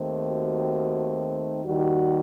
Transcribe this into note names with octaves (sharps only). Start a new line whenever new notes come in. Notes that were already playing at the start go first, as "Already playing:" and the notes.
Already playing: D#2 D#3 A3 C4
F#4
D#2 D#3 G3 F#4